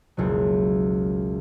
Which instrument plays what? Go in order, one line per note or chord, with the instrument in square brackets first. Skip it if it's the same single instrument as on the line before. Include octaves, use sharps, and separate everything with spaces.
[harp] F#1 C#2 B2 F#3